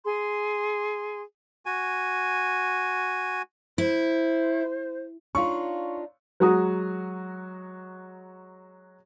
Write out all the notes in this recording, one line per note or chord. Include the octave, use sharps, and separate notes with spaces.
G#4 C6
F#4 G#5
E4 C5
D4 D#4 F4 C#5 F5 C6 C#6
F#3 G#3 F#4 A#5 D#6